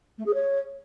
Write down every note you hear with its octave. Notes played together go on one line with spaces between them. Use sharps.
A3
G#4
C#5